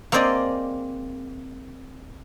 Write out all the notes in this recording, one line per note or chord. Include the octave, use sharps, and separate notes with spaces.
A#3 C4 G#4 C5 D5 D#5